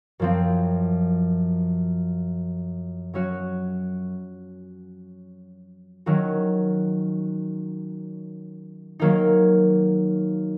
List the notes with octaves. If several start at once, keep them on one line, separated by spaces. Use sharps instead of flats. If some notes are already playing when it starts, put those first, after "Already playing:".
F#2 F3 C4
F#3 C#4 F#4
D#3 F#3 C#4 F#4
D#3 F#3 A#3 D#4